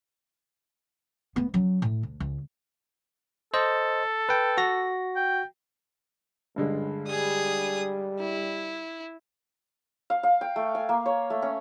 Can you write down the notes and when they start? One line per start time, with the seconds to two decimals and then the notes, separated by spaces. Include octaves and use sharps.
1.36 A3 B3
1.54 F#3 C#4
1.82 A2
2.03 D2
2.20 C#2
3.54 A4 C5 D#5
4.29 B4 G5
4.58 F#4 A#6
5.16 G5
6.56 C#2 G2 D3 G#3
7.07 G3 G#4 D#6
8.19 E4
10.10 F5
10.23 F5
10.41 G5
10.56 A3
10.75 G#5
10.89 A#3
11.06 C#5
11.30 A3
11.42 C#4